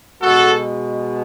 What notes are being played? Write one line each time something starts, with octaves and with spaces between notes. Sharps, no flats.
B2 G#3 F#4 A4